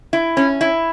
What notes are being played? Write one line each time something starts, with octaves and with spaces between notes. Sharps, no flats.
E4
C#4
E4